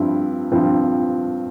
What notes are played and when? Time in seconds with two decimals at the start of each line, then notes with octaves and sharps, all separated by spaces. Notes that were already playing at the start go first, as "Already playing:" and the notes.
Already playing: G2 F3 C4 E4
0.51 G2 F3 C4 E4